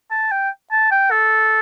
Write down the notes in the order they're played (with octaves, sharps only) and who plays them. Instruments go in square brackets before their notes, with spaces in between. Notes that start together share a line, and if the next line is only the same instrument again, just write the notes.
[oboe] A5
G5
A5
G5
A4